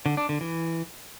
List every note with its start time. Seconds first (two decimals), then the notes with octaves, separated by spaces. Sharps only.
0.06 D3
0.17 D4
0.29 D3
0.41 E3